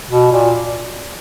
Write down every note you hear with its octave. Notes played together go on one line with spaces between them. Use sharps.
B2
A#2